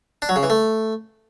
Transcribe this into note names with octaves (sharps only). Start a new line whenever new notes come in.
D4
F#3
C#3
E3
A3